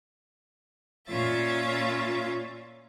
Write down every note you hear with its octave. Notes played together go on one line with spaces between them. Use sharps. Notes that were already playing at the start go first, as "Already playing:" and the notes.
A#2 C#4 F4 C#5 E5 A6